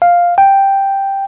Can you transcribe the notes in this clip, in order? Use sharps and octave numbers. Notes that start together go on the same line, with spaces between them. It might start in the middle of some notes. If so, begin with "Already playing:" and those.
F5
G5